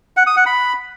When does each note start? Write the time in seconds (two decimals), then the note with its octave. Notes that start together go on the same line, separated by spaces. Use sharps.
0.17 F#5
0.27 D#6
0.36 F#5
0.46 B5